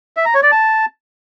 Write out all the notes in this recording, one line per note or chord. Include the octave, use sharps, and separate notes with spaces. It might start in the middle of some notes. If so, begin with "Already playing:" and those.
E5
A#5
C#5
D5
A5